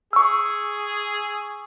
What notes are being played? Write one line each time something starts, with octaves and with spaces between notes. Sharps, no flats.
G#4 C#6 E6